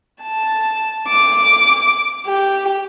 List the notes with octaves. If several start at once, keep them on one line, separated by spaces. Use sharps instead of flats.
A5
D6
G4